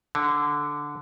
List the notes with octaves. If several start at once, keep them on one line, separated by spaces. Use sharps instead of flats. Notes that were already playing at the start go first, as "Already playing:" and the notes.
D3